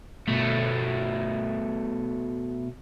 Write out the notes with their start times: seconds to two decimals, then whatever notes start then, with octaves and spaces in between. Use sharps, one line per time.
0.28 B2 A3